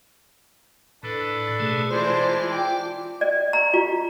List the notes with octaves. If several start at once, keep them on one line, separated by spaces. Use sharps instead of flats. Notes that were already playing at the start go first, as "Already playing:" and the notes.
A2 D4 A4 B4
B2 A3 G#4
E3 G#3 F4 C5 D5 A5
G5 D6
D5
A#5
F4